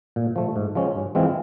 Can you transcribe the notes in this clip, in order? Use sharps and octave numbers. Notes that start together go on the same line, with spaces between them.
A#2
F3 A3
G#2
F3 G#3 C#4
G2
E3 G#3 C4 F4